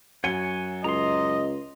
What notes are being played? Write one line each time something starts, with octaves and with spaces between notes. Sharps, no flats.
F#2 C#5 F#5 G#5 G7
C#2 D#5 A#5 C6